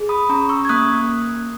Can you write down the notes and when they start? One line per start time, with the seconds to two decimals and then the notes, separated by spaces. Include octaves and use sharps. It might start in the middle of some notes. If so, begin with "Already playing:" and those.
Already playing: G#4
0.09 B5 D#6
0.29 C#4 A#5 C#6
0.49 C#6 E6
0.65 G#6
0.69 A#3 D#6 F#6